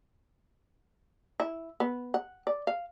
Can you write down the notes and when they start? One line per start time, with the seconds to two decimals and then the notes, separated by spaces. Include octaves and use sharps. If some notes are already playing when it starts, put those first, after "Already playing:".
1.40 E4
1.80 B3
2.14 F#5
2.47 D5
2.67 F5